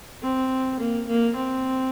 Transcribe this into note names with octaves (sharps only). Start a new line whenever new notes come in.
C4
A#3
A#3
C4